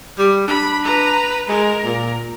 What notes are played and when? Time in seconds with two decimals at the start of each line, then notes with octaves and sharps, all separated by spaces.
0.18 G3
0.48 D4 B5
0.83 B4 A#5
1.49 G#3 A#4
1.85 A#2